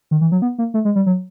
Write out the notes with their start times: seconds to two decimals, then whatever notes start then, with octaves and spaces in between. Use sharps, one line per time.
0.11 D#3
0.21 E3
0.32 F#3
0.42 B3
0.58 A#3
0.74 A3
0.85 G#3
0.96 G3
1.06 F#3